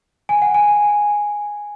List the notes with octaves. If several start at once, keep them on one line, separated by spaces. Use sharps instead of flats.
G#5
F#5
G#5